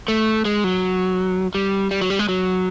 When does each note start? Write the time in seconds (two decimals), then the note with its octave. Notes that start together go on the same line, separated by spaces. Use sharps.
0.08 A3
0.45 G#3
0.64 F#3
1.55 G3
1.91 G3
2.01 F#3
2.10 G3
2.19 G#3
2.29 F#3